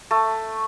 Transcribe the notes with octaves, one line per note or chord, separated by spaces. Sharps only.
A3